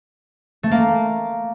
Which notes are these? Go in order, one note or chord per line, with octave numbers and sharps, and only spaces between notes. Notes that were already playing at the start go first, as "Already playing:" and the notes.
A3
A#3